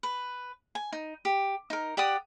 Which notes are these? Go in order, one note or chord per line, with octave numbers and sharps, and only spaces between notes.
B4
G#5
D#4
G4
D#4 A#4
G4 D5 F#5 D#6